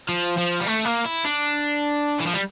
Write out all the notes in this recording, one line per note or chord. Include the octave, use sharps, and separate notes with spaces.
F3
F3
G3
A3
A#3
E4
D4
E3
F3
G3